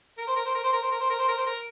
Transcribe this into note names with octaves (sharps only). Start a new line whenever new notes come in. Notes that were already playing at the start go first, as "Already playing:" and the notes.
A#4
C5
A#4
C5
A#4
C5
A#4
C5
A#4
C5
A#4
C5
A#4
C5
A#4